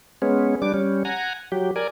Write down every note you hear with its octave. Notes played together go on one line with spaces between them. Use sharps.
G#3 B3 C#4
G3 D4 D6
G3 C#4
F#5 G#5 A#5
F#3 G4
A#4 D5 G#5